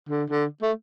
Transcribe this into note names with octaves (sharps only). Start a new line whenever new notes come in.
D3
D3
A3